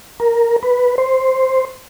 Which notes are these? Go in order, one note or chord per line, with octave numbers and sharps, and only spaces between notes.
A#4
B4
C5